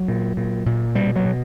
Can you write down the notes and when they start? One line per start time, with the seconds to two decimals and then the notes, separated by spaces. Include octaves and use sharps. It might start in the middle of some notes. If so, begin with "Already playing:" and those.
Already playing: F#3
0.08 A#2
0.37 A#2
0.66 A#2
0.95 B2 G3
1.16 F#3
1.25 B2